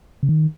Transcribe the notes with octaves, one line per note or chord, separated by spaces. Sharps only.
C#3
D#3